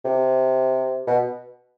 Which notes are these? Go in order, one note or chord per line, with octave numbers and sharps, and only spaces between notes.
C3
B2